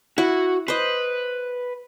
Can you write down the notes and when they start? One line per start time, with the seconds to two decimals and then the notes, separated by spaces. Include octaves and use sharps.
0.18 E4 F#4
0.68 B4 C5 D#5